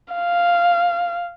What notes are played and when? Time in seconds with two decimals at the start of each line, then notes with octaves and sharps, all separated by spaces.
0.14 F5